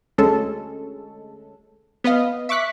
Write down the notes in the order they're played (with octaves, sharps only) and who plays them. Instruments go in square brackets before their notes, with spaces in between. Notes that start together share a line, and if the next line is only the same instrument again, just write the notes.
[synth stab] D2 G#3 C#4 A4
B3 B4 D#5 F5
E5 C#6 D6 F#6 B6